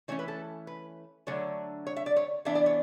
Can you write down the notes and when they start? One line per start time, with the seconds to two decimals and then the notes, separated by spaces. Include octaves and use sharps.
0.08 E3 A3 C#4 C#5
0.19 B4
0.28 A4
0.67 B4
1.27 D3 F#3 A3 D4 C#5
1.87 C#5
1.97 E5
2.06 D5
2.17 C#5
2.45 E3 B3 D4 E5
2.55 D5
2.66 C#5